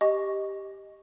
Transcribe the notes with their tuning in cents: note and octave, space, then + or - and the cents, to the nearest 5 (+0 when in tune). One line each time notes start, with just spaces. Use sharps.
G4 +0 D#5 +0 C#6 +0